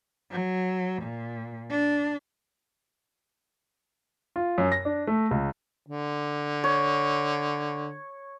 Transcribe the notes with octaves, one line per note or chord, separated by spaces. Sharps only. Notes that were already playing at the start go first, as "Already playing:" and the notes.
F#3
A#2
D4
F4
F#2
A#6
D4
A3
C#2
D3
C#5